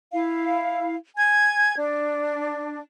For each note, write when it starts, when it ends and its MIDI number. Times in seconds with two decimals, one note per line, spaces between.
0.12 0.95 64
0.12 0.95 77
1.17 1.75 80
1.17 1.75 92
1.76 2.79 62